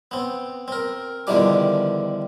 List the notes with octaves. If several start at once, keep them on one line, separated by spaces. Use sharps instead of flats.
B3 C4
C4 A#4
E2 D3 D#3 F3 G3 D6